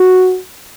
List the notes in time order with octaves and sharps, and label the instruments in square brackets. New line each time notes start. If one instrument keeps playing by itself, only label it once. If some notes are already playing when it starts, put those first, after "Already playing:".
Already playing: [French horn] F#4